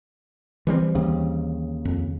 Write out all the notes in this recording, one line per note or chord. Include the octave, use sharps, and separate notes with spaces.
E3 G3 C4
D#2 C#3
F2